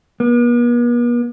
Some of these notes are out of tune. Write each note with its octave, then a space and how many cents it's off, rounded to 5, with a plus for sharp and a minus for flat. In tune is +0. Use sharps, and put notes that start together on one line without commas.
B3 -45